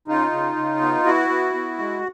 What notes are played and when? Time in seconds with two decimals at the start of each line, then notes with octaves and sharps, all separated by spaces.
0.08 C#3 D#4 F4
0.32 C#3
0.56 C#3
0.81 B3
1.05 B3 E4 F#4
1.29 B3
1.54 B3
1.78 G#3